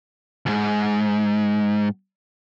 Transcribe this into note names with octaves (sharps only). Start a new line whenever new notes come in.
D2 G#2